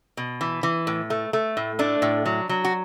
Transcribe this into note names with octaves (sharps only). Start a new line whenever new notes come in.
B2
E3
E3
A2
A3
A3
A2
A3 D4
A2
F#3
F#3
F#4